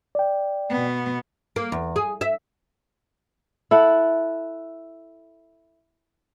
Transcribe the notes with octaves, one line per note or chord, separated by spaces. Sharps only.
D5 G5
B2 B3
A#3
E2
G#4
E5
E4 A4 F#5